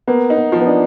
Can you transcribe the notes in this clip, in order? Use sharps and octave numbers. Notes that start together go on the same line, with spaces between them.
A#3 B3
D#4
B3
F3
B3
D4